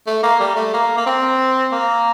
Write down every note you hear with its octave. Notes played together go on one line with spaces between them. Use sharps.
A3
A#3
G3
A3
A#3
A#3
C4
A#3